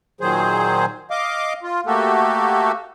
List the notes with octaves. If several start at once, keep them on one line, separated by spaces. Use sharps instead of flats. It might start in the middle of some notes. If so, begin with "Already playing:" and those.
A#2 D#3 F#3 G#4 C5
D#5 F5 D6
F4
A3 A#3 F#4 G4 A4